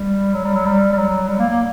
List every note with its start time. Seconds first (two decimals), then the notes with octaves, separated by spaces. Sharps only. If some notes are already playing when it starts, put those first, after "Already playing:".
Already playing: G3
0.34 F#3
0.45 G3
0.55 F#3
0.66 G3
0.93 G3
0.97 F#3
1.29 G3
1.39 A#3
1.50 A#3